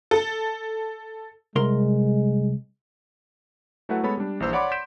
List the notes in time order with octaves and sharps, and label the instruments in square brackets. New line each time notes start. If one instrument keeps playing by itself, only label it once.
[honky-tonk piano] A4
[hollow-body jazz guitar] C2 A#4 C6 [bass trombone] G#3
[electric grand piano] F#3 A3 E4 A4 B4 F#5
G#3 B3 A4 C#5 B5
G3 D4
A#1 E3 C5 E6
C#5 D5 F#5 B5 C6 D6
C6 G6 B6 D7 E7